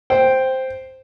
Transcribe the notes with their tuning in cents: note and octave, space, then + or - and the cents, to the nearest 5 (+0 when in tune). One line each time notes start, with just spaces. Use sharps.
C5 +0 G5 +0